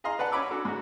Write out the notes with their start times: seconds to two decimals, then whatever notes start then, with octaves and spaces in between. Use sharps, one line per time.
0.04 G#4 D#5 F5 A#5 C6
0.19 B4 D5 F#5 A5
0.32 C#4 C#5 B5 D6 E6
0.51 D4 F#4 A4
0.65 G#2 F#4